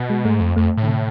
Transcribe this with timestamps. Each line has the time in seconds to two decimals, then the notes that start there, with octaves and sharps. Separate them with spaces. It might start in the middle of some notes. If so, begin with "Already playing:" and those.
Already playing: B2
0.10 G#3
0.25 G#2 A3
0.40 F2
0.56 F2 A3
0.77 A2
0.83 D3
0.87 C3